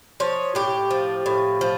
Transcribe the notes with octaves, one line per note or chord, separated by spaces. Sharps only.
F3 C#5
A2 G4
F3
A2
F3